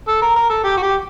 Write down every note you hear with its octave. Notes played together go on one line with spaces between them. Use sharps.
A4
A#4
A#4
A4
G4
F#4
G4